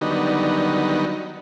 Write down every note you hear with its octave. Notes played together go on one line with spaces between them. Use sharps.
D3 D#3 F#3 G3 B3 D#4